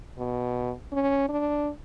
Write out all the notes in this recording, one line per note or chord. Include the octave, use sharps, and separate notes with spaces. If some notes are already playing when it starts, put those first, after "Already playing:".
B2
C#4
D4